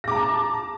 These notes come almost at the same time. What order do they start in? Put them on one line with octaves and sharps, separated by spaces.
A#6 D6 A#5 A5